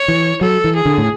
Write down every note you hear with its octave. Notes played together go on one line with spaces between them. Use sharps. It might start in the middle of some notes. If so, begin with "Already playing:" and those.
Already playing: C#5
E3
F#3 A4
E3
G#4
D3
A2